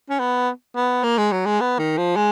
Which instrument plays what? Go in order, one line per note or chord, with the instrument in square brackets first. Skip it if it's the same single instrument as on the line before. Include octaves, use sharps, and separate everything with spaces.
[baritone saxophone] C#4
B3
B3
A#3
G#3
F#3
G#3
B3
D#3
F3
G#3